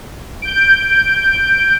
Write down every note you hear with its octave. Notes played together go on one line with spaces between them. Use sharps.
G6 D7